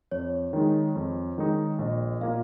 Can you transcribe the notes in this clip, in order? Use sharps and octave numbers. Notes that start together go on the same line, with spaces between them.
F2 C#5
D#3 G#3 D#4
F2
D#3 G#3 D#4
A#1 D#5
A#2 A#3 F4 F5